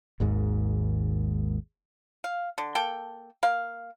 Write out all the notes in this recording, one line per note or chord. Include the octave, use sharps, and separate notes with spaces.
G#1 D#2 G#2
F5
D3
A#3 A4 G5
A#3 F5